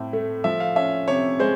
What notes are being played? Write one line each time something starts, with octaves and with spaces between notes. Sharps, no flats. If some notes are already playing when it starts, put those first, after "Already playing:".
Already playing: A2 C4
A3
F3 E5
F5
C#4 E5
C3 C#5
G#3 C5